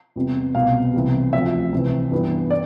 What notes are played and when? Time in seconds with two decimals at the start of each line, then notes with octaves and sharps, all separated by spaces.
0.16 E2 C3 G3 C4
0.55 C2 B2 B3 F5
0.94 C2 C3 E3 G3
1.33 D2 C3 F3 E5
1.72 C2 C3 E3
2.12 G2 E3 G3 B3
2.50 D5